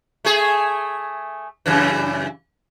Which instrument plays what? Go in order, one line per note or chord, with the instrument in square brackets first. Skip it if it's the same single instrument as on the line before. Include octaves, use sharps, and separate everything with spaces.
[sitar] A3 G#4
F#2 C#3 E3